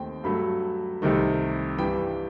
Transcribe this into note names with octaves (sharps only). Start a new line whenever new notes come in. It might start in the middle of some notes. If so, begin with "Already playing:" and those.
Already playing: D#2 D#3 A3 C4 G5
G2 F#3 A3 B5
C2 C3 D#3 A3
G2 E3 G3 G5